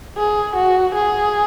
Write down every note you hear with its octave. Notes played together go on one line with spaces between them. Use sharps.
G#4
F#4
G#4